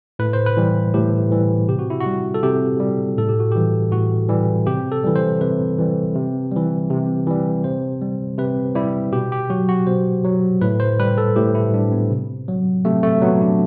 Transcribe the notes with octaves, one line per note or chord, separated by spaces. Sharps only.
A2 B4
C5
B4
E3 G3
A2 G4
E3 G3
C3 G4
F#4
E4
F#4
G3
A4
C3 G4
G3
A2 A4
G4
F#4
E3 G3 G4
A2 F#4
E3 G3
C3 G4
A4
E3 G3
C5
C3 B4
E3 G3
C3
E3 G3
C3
E3 G3
C3 C5
G3
C3 B4
G3 E4
B2 G4
G4
F#3 F#4
F#4
B2 C5
F#3
A2 B4
C5
G3 B4
A4
A2 G4
E4
G3 D4
B3
C3
F#3
C3 A3
A3
F#3 B3
D4